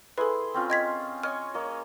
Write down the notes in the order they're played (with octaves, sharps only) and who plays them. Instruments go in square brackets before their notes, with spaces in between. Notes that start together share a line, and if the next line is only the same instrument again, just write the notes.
[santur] E4 G#4 C6 [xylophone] A4 B4
[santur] C4 C#4 F4
[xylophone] D#5 G#6 B6
[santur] C#5 D#5 G#5 [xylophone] F6
[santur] A#3 C#5 D#5